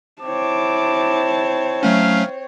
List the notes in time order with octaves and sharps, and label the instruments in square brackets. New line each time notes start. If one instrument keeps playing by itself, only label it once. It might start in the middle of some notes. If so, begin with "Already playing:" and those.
[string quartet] C4 C#5 [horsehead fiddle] E4 A5 [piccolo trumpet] D6
[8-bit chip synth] F#3 A3 C#4 [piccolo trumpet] F5